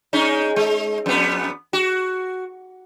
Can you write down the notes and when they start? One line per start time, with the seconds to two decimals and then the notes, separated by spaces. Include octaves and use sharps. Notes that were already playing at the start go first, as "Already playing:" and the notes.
0.13 G#3 C#4 D#4
0.56 G#3
1.06 F2 B3
1.73 F#4